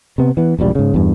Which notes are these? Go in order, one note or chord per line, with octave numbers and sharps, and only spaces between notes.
C3 B3
E3 B3
E1 A#1 G#2 G3
G#2 C#3
E2 G2